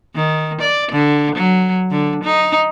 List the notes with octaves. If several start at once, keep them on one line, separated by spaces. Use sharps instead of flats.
D#3
D5
D3
F#3
D3
D#4